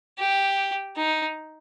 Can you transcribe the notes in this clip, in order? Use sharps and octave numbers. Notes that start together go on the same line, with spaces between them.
G4
D#4